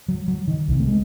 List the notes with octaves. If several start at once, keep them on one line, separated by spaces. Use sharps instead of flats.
F#3
F#3
D#3
C2 C3
A3
G#3